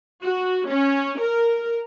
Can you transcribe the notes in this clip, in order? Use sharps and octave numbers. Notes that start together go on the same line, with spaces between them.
F#4
C#4
A#4